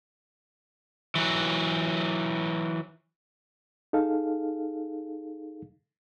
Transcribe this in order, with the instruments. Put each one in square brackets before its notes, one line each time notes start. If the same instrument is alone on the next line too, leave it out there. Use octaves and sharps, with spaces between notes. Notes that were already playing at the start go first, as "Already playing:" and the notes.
[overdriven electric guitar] E3 F#3
[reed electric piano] D#4 G#4 A4 F5